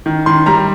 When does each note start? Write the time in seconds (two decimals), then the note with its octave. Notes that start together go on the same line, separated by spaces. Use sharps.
0.06 D#3
0.26 D#3 C6
0.46 G3 A#5